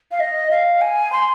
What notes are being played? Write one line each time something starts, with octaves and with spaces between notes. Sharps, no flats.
F5
D#5
F5
G#5
C6